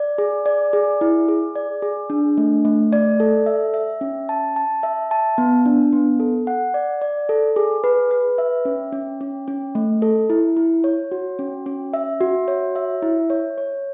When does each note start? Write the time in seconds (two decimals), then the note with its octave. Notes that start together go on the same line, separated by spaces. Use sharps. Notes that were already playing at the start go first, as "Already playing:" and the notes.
Already playing: D5
0.18 G#4
0.46 D5
0.73 G#4
1.01 E4
1.28 G#4
1.56 D5
1.82 G#4
2.10 D4
2.38 A3
2.65 A3
2.93 D5
3.20 A4
3.46 E5
3.74 E5
4.01 C#4
4.29 A5
4.56 A5
4.83 E5
5.11 A5
5.38 B3
5.66 D4
5.93 B3
6.20 A4
6.47 F#5
6.74 D5
7.02 D5
7.29 A4
7.56 G#4
7.84 B4
8.11 B4
8.38 E5
8.65 C#4
8.93 C#4
9.21 C#4
9.48 C#4
9.75 A3
10.02 A4
10.30 E4
10.57 E4
10.84 C#5
11.12 F#4
11.39 C#4
11.66 C#4
11.94 E5
12.21 F#4
12.48 C#5
12.76 E5
13.02 E4
13.30 C#5
13.58 C#5